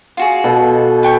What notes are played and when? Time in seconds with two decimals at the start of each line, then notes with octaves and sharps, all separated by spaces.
0.17 F4 F#4 G#4
0.44 B2 A4
1.03 B4 G5 C#6